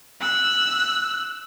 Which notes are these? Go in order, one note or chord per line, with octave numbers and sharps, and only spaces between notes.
E6 F#6